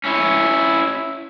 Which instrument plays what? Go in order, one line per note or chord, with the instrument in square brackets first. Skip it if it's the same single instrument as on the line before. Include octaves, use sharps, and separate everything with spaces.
[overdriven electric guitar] C#4 E4